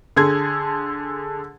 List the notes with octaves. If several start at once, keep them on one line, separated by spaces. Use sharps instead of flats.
D3 G#4 A4 C6 G#6